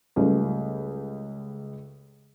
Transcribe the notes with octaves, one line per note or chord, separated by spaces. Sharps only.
C#2 G3 A3